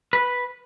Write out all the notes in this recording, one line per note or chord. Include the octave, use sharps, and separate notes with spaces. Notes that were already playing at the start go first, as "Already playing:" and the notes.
B4